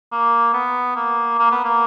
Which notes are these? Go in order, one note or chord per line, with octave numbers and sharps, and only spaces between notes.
A#3
B3
A#3
A#3
B3
A#3